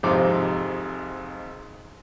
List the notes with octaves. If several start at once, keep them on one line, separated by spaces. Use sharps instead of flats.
G#1 F2 C3 D#4 D6